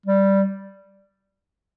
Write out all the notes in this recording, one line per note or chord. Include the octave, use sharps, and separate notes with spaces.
G3